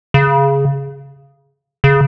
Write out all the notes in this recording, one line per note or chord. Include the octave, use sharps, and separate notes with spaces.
C#3
C#3